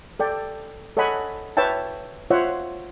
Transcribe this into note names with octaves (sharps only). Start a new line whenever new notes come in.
A4 D5 G5
A4 C#5 D#5 F#5 G#5 B5
B4 C#5 E5 G5 A5
F4 C5 C#5 E5 F#5